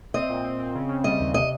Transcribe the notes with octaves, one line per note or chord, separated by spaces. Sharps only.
C4 D#5
A#2
C4
C4
C#3
C#3
G3 D#5
D#2
C3 D#5